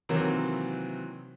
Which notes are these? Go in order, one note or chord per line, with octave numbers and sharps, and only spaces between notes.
C3 D#3 E3 F#3 A#3 C4